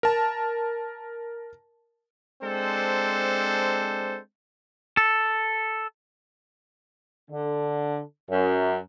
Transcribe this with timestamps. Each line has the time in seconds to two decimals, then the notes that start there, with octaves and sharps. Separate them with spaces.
0.03 A#4 A5
2.42 G#3 C4 D4 A4 C5
4.97 A4
7.30 D3
8.30 F#2